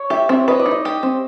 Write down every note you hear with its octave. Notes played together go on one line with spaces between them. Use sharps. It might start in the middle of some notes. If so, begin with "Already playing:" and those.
Already playing: C#5
G4 E5
C4 E5
B4 D#5
D5
D#4
D#5
G4
C4